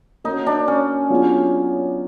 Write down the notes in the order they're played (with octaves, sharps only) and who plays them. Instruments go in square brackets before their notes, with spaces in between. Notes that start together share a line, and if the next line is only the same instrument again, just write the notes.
[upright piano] A#3 C#4 F#4 [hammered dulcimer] D#4
[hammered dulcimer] D4
C#4
[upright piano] F#3 B3 D4 F4 G#4